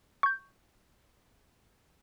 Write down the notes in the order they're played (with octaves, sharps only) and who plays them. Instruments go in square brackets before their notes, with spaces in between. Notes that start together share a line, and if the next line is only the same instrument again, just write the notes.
[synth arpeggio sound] C#6 G6